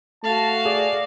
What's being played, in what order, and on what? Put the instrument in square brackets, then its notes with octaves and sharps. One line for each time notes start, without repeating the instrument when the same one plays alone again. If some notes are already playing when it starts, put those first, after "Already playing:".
[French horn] A3 [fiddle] F#4 F5 [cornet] A5
[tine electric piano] G#4 [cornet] D5